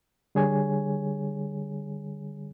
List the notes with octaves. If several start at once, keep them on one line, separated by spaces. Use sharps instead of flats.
D3 G3 G#4 C#5 G#5